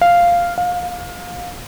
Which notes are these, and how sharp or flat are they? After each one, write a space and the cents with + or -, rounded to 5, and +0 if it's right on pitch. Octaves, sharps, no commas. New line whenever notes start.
F5 -5
F5 +25